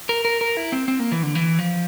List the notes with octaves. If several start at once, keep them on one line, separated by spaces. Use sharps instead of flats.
A#4
A#4
A#4
E4
C4
C4
A#3
E3
D3
E3
F3